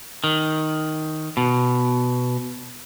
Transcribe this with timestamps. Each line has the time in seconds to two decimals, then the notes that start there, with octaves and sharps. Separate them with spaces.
0.24 D#3
1.37 B2